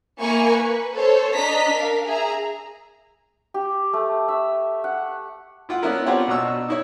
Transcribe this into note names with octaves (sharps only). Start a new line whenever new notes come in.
A#3 E4 G#5 C#6
B4
A4 C5 C#5
D4 D#5 A#5 B6
A#4 F5
G#4 E5 A#5
G4
A3
E5
F#5
E4 F4 F#5
B3 C#4 D4 E4 A#4
C4 D4 F4 G4 C#5 F#5
B2 D4 A#5 C#6 E6
E6
D#4 E4 C#5